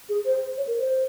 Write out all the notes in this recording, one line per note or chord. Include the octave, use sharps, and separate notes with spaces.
G#4
C5
C#5
A#4
C5